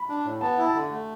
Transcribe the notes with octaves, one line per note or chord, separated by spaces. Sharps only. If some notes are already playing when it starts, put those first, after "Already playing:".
Already playing: B5
D4
A2
B3 A5
E4 F#5
A5
D3
A3